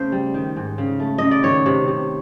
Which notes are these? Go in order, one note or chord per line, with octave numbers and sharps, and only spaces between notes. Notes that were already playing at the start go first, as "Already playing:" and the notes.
Already playing: C#3 A3 C5
G3
D#3
G#2
C#3
A3
C#3 D#5
D5
D#3 C#5
C3
C3